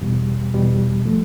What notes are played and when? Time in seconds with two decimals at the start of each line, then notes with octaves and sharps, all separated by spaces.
0.01 E2 B2 G3
0.53 E2 B2 G3
1.05 F3 A3